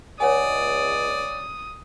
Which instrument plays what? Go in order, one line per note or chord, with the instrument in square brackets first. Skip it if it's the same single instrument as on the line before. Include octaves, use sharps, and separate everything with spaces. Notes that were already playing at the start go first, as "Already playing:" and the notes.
[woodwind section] C#2 [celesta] C#5 F#5 G#5 [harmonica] D5 [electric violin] D#6